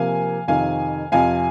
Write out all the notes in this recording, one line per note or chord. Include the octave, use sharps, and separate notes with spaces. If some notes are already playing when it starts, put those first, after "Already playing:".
Already playing: C3 F3 A#3 F5 G#5
F2 C3 D#3 F5 G#5
F2 C3 F3 F5 G#5